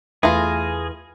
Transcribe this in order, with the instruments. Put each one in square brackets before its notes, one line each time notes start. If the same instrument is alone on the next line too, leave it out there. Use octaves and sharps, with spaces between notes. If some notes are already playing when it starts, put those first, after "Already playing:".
[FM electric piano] E2 A3 A#6 [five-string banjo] E3 F4 [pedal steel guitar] G#4